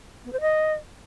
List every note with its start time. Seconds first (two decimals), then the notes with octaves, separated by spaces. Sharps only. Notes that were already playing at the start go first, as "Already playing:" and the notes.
0.25 B3
0.33 C5
0.41 D#5